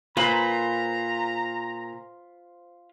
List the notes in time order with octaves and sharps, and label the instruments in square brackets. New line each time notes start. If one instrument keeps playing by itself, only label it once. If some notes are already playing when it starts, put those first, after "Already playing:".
[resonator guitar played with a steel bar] A#2 [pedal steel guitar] F4 C5 B5 [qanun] B4 [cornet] A#5